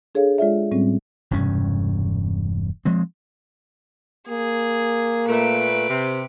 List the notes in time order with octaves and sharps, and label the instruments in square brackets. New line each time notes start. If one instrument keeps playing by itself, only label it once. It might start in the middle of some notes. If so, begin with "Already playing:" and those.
[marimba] D4 G#4 A4 C#5 F5
G#3 F4 D5 E5
A2 G3 C4 C#4
[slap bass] E1 G2 C3 C#4
F3 G#3 C4
[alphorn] A#3 [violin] G#4
[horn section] A#2 A3 [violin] B4 D7
[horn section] C3